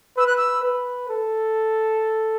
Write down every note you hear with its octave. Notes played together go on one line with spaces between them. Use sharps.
B4 E6
F#6
E6
B4
A4